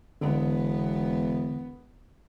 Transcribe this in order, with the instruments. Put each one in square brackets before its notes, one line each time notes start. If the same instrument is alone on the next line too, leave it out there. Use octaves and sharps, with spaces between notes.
[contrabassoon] E1 [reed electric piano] D3 [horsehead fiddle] B3